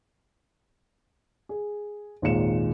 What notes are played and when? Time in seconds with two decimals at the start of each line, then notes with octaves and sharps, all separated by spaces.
1.49 G#4
2.22 G#1 D#2 A#2 G#3 C#7 E7